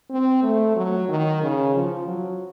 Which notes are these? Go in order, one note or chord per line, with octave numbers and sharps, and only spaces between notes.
C4
A3
F#3
D#3
C#3
F3
F#3